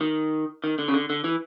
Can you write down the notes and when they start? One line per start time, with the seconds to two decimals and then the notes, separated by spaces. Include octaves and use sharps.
0.01 D#3
0.64 D#3
0.79 D3
0.88 C#3
0.94 D3
1.10 D3
1.24 E3